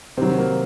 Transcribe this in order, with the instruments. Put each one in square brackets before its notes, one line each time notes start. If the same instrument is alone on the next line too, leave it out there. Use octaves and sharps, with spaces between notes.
[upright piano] C3 D#3 F#3 [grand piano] C4
[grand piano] A#3